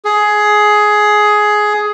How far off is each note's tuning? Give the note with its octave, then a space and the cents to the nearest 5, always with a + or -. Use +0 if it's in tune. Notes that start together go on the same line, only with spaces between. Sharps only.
G#4 +15